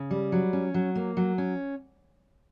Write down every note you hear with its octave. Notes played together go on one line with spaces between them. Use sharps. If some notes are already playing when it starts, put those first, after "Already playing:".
Already playing: C#3
G3
F#3
C#4
F#3
A#3
F#3
C#4